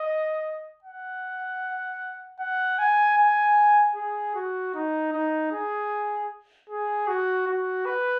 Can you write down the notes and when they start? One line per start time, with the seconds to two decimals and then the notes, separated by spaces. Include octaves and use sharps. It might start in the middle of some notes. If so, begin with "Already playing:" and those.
Already playing: D#5
0.84 F#5
2.40 F#5
2.78 G#5
3.17 G#5
3.96 G#4
4.35 F#4
4.74 D#4
5.13 D#4
5.52 G#4
6.70 G#4
7.08 F#4
7.47 F#4
7.85 B4